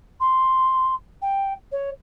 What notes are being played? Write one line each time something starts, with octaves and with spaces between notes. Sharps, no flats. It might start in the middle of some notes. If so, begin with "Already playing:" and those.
C6
G5
C#5